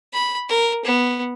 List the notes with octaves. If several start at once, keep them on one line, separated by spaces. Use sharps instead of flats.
B5
A#4
B3